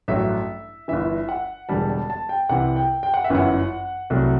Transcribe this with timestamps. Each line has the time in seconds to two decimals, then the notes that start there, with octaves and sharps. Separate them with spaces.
0.08 A1 G2 F#3 A3 E5
0.88 G1 G2 E3 E5
1.29 F#5
1.69 E1 E2 D3 G3 A5
1.89 A5
2.10 A5
2.29 G5
2.49 C2 C3 E3 F#5
2.76 G5
3.03 G5
3.14 F#5
3.24 E5
3.30 G1 F#2 E3 F#5
4.10 C2 C3 F#3 A3